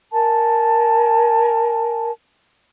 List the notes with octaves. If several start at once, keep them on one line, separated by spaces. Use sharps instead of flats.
A#4 G#5 A5